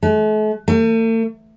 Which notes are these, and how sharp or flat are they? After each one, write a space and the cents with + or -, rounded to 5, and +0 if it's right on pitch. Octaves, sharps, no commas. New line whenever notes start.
A3 -45
A3 +45